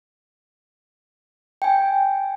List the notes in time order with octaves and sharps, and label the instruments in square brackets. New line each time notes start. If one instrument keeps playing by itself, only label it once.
[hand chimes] G5 G#5